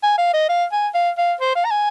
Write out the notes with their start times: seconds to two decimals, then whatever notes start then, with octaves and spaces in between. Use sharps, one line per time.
0.03 G#5
0.18 F5
0.34 D#5
0.49 F5
0.72 G#5
0.94 F5
1.18 F5
1.41 C5
1.55 F5
1.65 A#5
1.71 G#5